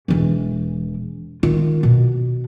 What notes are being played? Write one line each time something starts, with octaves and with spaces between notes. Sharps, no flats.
E1 E3
D#3 F4
B2